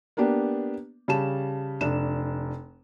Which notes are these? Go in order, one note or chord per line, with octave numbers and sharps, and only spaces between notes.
A#3 B3 D4 G4
C#3 G3 A5 E7
F1 D4 E7